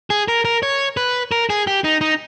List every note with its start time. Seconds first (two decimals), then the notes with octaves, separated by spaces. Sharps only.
0.10 G#4
0.28 A#4
0.45 A#4
0.63 C#5
0.97 B4
1.32 A#4
1.50 G#4
1.67 G4
1.84 D#4
2.01 D#4